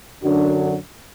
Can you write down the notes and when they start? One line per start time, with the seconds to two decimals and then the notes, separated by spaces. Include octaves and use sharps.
0.21 F#2 D3 F#3 D4 F#4